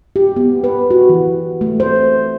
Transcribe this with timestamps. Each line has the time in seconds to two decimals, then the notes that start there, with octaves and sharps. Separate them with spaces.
0.16 G4
0.36 B3
0.64 B4
0.91 F#4
1.10 E3
1.61 A3
1.80 C5